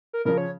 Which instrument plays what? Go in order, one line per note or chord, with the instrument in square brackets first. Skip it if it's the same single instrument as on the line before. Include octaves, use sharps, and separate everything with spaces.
[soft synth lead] A#4
[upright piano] C#3 F3 C#4 [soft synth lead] A#4
[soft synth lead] C#5